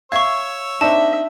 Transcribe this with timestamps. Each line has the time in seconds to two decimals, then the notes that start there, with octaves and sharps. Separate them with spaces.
0.12 C#5 E5 F5 C#6 E6 G#6
0.81 C4 D4 D#4 E5 A5